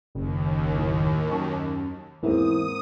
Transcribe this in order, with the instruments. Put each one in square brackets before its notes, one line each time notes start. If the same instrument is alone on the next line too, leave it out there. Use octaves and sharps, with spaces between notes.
[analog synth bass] F#1 [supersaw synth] D#2
[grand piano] A2 F#3
[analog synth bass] F#2 [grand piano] G#5 A5 C#6
[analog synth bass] E2 [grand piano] G#2 A#3 C4 [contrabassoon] E3 [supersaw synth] D#6